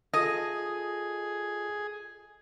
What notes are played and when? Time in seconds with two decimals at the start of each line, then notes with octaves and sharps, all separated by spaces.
0.14 F4 G#4 A4 D#5